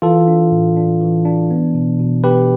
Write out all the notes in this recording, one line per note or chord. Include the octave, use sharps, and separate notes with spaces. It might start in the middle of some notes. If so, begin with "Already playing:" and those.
E3 F4 A4
D4
A2
D4
E3
D4
B3
B2
B2
B2 G4 B4